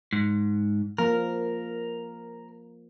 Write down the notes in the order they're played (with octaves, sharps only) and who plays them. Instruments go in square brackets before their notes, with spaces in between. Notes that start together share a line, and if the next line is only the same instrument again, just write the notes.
[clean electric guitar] G#2
[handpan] F3 A#3 [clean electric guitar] A#4